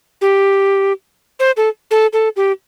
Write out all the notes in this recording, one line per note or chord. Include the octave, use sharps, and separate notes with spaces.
G4
C5
A4
A4
A4
G4